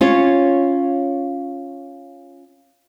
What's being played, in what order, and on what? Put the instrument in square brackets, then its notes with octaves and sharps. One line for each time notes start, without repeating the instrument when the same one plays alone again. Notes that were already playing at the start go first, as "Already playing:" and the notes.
[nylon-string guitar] C#4 F4 C#5